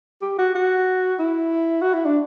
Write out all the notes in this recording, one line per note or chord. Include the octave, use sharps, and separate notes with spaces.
G4
F#4
F#4
E4
F#4
E4
D4